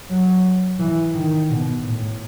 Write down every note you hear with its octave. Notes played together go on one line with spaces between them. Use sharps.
F#3
E3
D#3
B2
A2